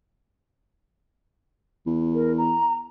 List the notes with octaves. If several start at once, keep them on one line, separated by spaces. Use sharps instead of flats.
E2
A#4
A#5